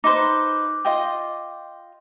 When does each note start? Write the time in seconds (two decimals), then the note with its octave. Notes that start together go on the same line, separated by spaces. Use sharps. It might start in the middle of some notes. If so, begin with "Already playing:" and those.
0.04 D#4 B4 C5 D6
0.85 F4 D#5 G5